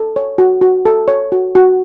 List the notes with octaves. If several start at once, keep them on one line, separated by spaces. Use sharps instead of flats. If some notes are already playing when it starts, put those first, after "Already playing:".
Already playing: A4
C#5
F#4
F#4
A4
C#5
F#4
F#4